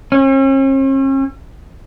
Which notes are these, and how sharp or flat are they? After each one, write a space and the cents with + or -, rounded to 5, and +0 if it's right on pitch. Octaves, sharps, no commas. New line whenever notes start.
C#4 -45